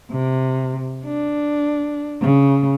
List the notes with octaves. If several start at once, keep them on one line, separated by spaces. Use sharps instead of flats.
C3
D4
C#3